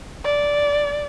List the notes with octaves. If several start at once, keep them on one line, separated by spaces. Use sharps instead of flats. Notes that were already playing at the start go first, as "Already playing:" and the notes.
D5